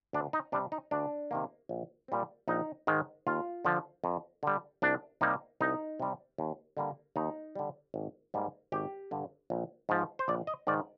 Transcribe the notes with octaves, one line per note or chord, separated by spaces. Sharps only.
D2 D4
D#4
C3 G3 D4
D#4
D2 D4
C3 D#3 A#3
A#1
A#2 G3 C4
A#1 D#4
G#2 D#3 G#3
D#2 F4
D3 F3
F2
D3 G3
C2 D4
C3 G3 A#3 D#4
C2 D#4
C3 G3
D#2
D3 G3 A#3
D#2 D#4
D3 G3
G#1
G#2 G3 A#3
G#1 G4
G2 D3
A#1
G#2 F3
C5
A#1 D5
D#5
G#2 D#3 D5